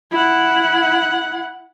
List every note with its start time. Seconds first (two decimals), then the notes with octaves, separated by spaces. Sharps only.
0.11 E4 F#5